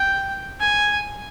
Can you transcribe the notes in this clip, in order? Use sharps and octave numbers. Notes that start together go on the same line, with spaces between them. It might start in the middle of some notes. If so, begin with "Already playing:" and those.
Already playing: G5
G#5